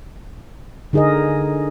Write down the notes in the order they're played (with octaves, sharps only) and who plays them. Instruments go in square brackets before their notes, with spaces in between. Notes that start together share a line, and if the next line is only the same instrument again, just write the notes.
[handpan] D3 D#4 G#4 A#4 D#5